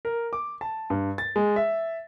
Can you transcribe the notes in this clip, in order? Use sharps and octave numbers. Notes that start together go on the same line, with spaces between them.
A#4
D6
A5
G2
A6
G#3
E5